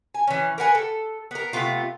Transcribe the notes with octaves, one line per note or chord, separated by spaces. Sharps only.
G#5
E3 C#4
A#4 B4 F#5 G#5
A4
B3 A#4
C3 A3 B3 F4